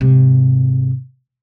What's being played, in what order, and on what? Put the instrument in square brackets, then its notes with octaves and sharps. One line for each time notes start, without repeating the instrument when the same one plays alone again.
[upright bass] G#2 C3